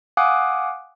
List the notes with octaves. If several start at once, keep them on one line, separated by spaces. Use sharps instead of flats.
F5 F#5 G#5 D6 D#6 F#6